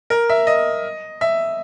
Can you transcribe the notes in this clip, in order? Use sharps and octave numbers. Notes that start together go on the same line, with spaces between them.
A#4
E5
D#5
E5